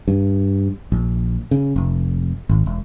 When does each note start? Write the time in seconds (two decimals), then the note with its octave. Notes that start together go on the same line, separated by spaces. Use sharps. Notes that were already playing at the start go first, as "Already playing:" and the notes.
0.08 G2
0.92 A#1
1.51 C#3
1.76 F1
2.49 G#1
2.66 E1